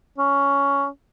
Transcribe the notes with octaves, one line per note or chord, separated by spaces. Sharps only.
C#4